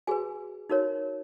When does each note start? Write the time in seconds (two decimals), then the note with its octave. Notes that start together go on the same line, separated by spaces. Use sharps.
0.07 F#4 G#4 B4 G#5
0.69 D#4 F#4 A#4 C#5